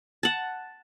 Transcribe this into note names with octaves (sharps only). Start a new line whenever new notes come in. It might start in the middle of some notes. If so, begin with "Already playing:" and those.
F#5 A5